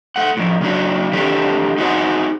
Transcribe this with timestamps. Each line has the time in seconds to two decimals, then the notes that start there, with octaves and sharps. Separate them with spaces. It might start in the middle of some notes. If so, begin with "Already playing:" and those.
0.16 A3 F#5
0.37 A2 F3
0.61 C#3 F#3 C#4 D4 F#4
1.13 D#3 E3 A3 C4 D4 G4
1.78 D#4 F#4 G#4 C5 D5 F#5